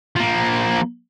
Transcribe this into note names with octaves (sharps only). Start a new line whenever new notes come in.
F3 A#3